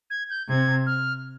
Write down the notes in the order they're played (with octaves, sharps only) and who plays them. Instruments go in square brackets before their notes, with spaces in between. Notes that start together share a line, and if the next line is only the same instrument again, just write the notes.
[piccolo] G#6
G6
[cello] C3 [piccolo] G#6
[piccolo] F6